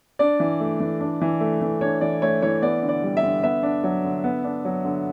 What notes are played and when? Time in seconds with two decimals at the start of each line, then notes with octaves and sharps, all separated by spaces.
0.19 D4 D5
0.40 E3
0.60 A3
0.80 E3
1.01 D4
1.21 E3
1.40 A3
1.61 E3
1.81 D4 C#5
2.01 E3 D5
2.22 A3 C#5
2.42 E3 C#5
2.62 B3 D5
2.83 D3
2.89 D5
3.03 G3
3.17 E5
3.23 D3
3.43 B3 E5
3.63 D4
3.84 F#3
4.05 D3
4.24 B3
4.44 D4
4.65 F#3
4.85 D3